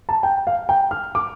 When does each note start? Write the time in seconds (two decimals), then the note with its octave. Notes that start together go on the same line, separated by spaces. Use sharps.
0.09 A5
0.23 G5
0.47 F5
0.69 G5
0.91 F6
1.15 D6